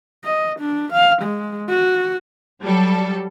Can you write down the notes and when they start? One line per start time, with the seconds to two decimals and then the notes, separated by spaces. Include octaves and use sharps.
0.24 D#5
0.60 D4
0.93 F5
1.22 G#3
1.69 F#4
2.63 F#3 G3 A4